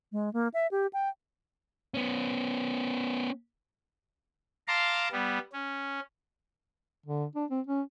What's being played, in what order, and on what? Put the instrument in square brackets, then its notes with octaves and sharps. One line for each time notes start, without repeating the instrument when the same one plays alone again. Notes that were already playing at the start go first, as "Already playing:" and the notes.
[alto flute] G#3
A#3
E5
G4
G5
[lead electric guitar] B3 C#4
[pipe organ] F5 A5 A#5 C6 D6
G3 B3
C#4
[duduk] D3
D4
C4
C#4